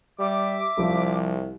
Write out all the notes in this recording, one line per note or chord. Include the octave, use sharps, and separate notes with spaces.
G3 E5 D6
C2 F3 G3